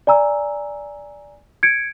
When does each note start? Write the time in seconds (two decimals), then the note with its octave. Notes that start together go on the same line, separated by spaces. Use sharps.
0.07 D5 G#5 A#5 E6
1.63 G#6 C#7 D7